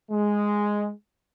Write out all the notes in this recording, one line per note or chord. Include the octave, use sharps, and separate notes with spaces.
G#3